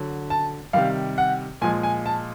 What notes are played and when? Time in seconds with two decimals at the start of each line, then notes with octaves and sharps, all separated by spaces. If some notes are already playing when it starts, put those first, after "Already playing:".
Already playing: D3 F#3
0.30 A5
0.73 C3 D#3 G3 F5
1.18 F#5
1.62 A#2 F3 G#3 G#5
1.83 G#5
2.06 A5